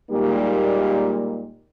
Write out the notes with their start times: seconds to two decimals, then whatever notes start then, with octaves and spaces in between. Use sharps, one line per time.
0.10 A#2 G3 G#3 A#3 D#4 G4